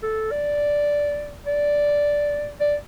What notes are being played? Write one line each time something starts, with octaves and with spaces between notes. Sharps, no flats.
A4
D5
D5
D5